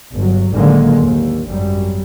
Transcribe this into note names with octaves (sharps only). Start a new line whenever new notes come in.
G1 F#3
A1 D3 D#3 F#3 G#3 A#3
D#2
G#1 F#2 F#3 G3